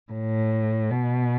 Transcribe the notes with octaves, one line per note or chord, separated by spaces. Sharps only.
A2
B2